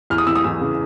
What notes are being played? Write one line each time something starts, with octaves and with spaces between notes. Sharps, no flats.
E2 F6
D#6
E3 E6
D#6
E2 E6
C#3